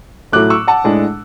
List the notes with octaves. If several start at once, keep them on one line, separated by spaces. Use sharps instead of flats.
A2 F#3 A3 D6 F#6
C#6 E6
F#5 A5
A2 G#3 D4